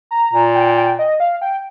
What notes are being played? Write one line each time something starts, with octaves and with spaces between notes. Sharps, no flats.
A#5
A#2
G5
G5
D#5
F5
G5